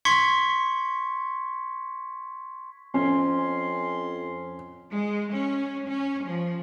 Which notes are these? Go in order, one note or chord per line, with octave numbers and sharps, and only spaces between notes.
C6 C#6 G#6 B6 C#7
F2 C#4 C6
G#3
C#4
C#4
F3